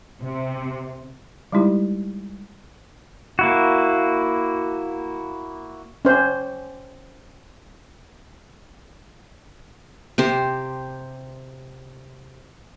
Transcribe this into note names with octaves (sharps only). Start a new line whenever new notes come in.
C3
G3 G#3 D#4 E4 G4
A#3 E4 F#4
C#4 C5
C3 G4 C5